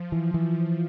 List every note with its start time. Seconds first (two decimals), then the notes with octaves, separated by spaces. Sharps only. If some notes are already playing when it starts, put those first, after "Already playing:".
Already playing: F3
0.12 E3
0.34 E3